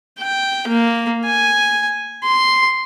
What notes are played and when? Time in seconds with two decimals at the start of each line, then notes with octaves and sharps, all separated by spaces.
0.20 G5
0.67 A#3
1.25 G#5
2.24 C6